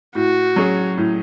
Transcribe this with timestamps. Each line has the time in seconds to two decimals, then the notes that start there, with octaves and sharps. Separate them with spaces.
0.15 A2 F#4
0.56 F#3 C#4 G#4
0.97 A2